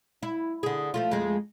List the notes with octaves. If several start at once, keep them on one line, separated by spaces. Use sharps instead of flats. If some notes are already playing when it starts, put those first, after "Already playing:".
E4
D3 G#4
F3 A3 F4
F2 G#3